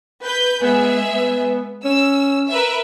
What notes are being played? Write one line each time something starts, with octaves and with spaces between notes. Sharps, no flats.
B4 G6
G#3 B3 G#4 E5
B3
C#4 E6
A#4 B4 E5